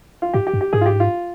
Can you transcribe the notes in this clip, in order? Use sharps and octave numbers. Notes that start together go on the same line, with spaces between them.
F4
G#2 G4
G4
G2
G4
G#2 G#4
F4
G4
F4